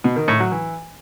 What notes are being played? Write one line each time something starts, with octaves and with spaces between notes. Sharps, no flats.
B2
D#3
A2
F#3
E3